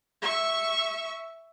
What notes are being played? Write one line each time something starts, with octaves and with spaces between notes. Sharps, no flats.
E5 C#6